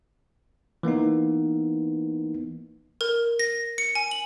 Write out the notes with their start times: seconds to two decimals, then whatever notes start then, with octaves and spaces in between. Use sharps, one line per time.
0.83 E3 A#3 B3 D#4
3.01 A#4
3.39 A#6
3.78 C#7
3.95 G#5
4.11 F#7